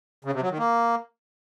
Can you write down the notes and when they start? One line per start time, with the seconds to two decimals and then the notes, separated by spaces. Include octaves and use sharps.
0.25 C#3
0.33 C3
0.42 F#3
0.50 D#3
0.59 A#3